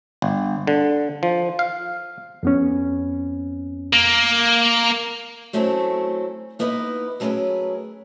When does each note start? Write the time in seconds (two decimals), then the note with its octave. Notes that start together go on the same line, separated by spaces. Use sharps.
0.22 G1
0.67 D3
1.23 F3
1.59 F5
2.43 F2 B3 C#4
3.93 A#3
5.53 F#3 A3 C4 C#4 E4 A4
6.59 A#3 B3 D#4 E4 B4
7.20 F#3 A3 C#4 G#4 A#4 B4